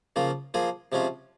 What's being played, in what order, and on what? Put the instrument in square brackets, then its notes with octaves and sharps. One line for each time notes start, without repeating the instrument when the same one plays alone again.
[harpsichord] C#3 F3 A#3 F4
F3 A#3 F4 G#4
C3 F3 G#3 C#4 F4